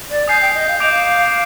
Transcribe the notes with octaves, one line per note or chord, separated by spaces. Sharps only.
D5
G#5 D#6 G6 C7
G5
D#5
F5
D#5 D6 G6 D7 F7
F5